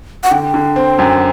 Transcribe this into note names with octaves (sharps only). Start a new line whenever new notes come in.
F#5
D3 G5
D3
C4
F#2